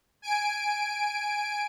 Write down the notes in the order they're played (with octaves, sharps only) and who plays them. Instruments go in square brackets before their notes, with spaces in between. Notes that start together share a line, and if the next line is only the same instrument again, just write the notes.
[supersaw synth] G#5 D7